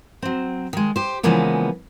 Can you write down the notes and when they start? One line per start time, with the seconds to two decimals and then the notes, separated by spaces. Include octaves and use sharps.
0.22 F#3 C4
0.73 D#3 G#3
0.96 G4 C5
1.23 C#3 E3 F3 G#3 A#3 B3